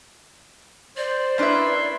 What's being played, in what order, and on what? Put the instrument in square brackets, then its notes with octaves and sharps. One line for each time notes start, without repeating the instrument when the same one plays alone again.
[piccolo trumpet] C5 [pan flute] D5
[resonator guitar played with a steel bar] A#3 D4 E4 [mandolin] C#4 B4 E5 [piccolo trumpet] C6